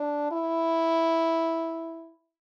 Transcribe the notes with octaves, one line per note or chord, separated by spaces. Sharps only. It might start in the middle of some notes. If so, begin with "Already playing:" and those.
Already playing: D4
E4